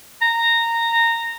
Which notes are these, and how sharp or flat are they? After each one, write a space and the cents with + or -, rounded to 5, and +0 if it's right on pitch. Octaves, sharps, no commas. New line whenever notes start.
A#5 -15